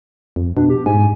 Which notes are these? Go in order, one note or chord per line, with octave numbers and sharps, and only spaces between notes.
F2
B2 D4
G4
G#2 G#5